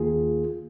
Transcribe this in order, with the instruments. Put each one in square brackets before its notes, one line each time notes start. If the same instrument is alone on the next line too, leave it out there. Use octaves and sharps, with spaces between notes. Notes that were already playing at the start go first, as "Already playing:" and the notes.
Already playing: [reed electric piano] D#2 D#3 A#3 F4 G#4